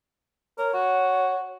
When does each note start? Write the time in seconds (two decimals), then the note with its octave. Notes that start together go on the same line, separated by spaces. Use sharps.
0.58 A#4 C#5
0.74 F#4